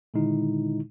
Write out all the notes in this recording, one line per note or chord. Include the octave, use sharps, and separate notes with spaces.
A#2 D3 D#3 G#3 D#4 E4